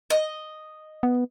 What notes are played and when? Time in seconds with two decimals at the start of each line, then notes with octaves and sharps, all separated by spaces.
0.10 D#5
1.03 B3